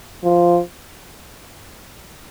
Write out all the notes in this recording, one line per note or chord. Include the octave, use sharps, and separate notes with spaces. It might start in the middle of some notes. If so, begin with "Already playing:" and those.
F3